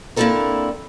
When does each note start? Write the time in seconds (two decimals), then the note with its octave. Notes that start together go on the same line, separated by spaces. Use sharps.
0.16 A#3 C4 D4 E4 A4 A#4